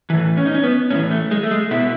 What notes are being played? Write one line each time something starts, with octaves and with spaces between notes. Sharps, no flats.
A2 E3
C#4
D#4
C#4
B3
A2 E3 C#4
A3
G#3
A3
G#3
B2 E4